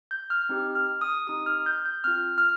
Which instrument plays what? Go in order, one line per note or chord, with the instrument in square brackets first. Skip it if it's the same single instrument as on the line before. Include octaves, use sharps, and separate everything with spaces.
[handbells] G6
F6
C4 D#4 G4
F6
D#6
C4 D#4 G4 D#6
F6
G6
G6
C4 F4 F6
F6